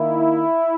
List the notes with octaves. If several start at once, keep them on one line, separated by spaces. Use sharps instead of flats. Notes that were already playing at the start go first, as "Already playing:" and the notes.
Already playing: D#3 A#3 E4